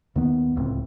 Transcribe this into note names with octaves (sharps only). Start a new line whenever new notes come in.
D#2 D#3 B3
D1 C#2 A2 C4